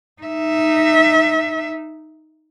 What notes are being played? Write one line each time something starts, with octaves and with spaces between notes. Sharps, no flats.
D#4 E5